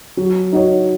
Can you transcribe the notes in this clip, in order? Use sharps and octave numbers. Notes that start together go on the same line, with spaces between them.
F#3
D#4 F#4 C#5